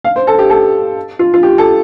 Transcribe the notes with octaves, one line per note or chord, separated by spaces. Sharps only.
F5
C5
A4
G4
A4
F4
F4
G4
A4